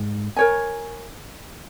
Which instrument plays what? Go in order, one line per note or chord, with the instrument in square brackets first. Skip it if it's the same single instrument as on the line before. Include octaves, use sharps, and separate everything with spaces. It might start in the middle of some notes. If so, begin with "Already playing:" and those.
Already playing: [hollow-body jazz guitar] G#2
[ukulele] A#4 C#5 G#5